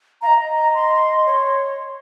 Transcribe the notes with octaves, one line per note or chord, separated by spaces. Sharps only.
D#5 F5 A#5
A#5
C6
C#5